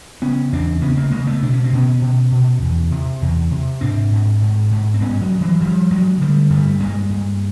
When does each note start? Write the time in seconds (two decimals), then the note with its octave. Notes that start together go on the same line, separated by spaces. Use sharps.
0.22 C#3 B3 C#4
0.52 E2 C4 D4
0.82 C#3 B3 C#4
0.97 A#3 C4
1.11 C#3 G#3 A#3
1.27 A3 B3
1.42 B2 D4
1.53 C#4
1.64 C4
1.73 B2 B3 C#4
2.02 B2
2.32 B2
2.62 E2
2.91 C3
3.21 E2
3.51 C3
3.81 G#2 C4 D4
4.12 G#2
4.42 G#2
4.71 G#2
4.94 C4
5.01 G2 B3 C#4
5.21 F#3 G#3
5.31 G2
5.41 E3 F#3
5.60 G2 F3 G3
5.90 G2 F#3 G#3
6.21 D3 G3 A3
6.50 G2 G3 A3
6.80 G2 G#3 A#3
7.10 G2